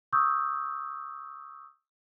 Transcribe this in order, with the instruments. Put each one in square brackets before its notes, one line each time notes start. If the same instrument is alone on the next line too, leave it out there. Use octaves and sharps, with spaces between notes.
[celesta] C#6 D#6 E6 G6